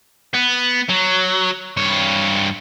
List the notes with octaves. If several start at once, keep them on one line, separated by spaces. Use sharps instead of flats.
B3
F#3
G2 C#5